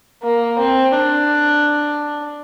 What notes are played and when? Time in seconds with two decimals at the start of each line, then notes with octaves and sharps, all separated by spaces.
0.23 A#3
0.59 C4
0.94 D4